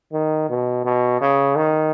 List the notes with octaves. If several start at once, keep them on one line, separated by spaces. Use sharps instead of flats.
D#3
B2
B2
C#3
D#3